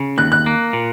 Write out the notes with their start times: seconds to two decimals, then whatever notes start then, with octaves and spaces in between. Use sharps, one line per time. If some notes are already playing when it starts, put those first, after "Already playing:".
Already playing: C#3
0.18 D#2 F#6
0.32 F#6
0.46 A#3
0.73 A#2